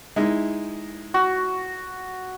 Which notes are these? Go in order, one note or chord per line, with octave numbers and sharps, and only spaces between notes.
G#3 D#4 E4
F#4